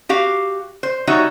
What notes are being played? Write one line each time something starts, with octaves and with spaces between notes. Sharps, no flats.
F#4 G4 F5
C5
G3 D#4 F#4 C#5 E5